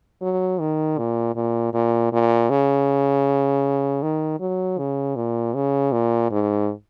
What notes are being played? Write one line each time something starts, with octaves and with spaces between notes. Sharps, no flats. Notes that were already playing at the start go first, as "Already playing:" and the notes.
F#3
D#3
A#2
A#2
A#2
A#2
C#3
D#3
F#3
C#3
A#2
C#3
A#2
G#2